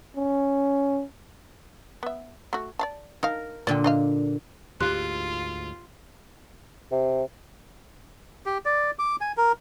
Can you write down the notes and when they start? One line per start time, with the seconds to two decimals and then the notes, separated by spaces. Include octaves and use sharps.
0.17 C#4
2.03 B3 E5
2.53 A3 F#4
2.79 D5 F5 A5
3.23 D#4 A#4 F5
3.67 A#2 D3 D5 G5
3.84 D4 D#5 F5
4.81 D2 G#2 F4 G4 C6 F#6
6.92 C3
8.46 G4
8.65 D5
8.99 D6
9.21 G#5
9.37 A#4